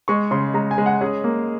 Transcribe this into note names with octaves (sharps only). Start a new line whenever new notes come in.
G#3 C#6
C#3 C6
G#3 A#5
G#5
G#3
F#5
C#4 G#4
A#3